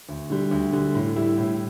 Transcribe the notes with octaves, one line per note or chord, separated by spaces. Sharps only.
D2
D3 G3
D2
D3 G3
A2
G3 E4
A2